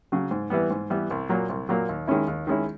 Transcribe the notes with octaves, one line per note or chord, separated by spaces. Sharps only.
C#3 F#3
G#2
E3 G3 B3
G#2
E3 G3 B3
C2
A#2 F#3 A#3
C2
A#2 F#3 A#3
D#2
D#3 G#3 C#4 E4
D#2
D#3 G#3 C#4 E4